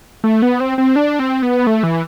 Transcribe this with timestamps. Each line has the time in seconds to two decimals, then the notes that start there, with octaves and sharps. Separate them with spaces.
0.24 A3
0.42 B3
0.60 C4
0.78 C4
0.96 D4
1.19 C4
1.42 B3
1.67 A3
1.83 E3